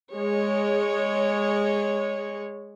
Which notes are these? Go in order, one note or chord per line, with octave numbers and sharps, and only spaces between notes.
G#3 C#5